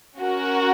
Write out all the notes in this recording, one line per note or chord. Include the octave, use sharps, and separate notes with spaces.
C#4 F#4 A#4